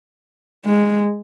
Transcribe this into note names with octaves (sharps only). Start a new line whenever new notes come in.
G#3